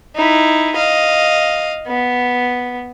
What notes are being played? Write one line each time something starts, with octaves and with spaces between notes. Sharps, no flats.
D#4 E4
D#5 F5
B3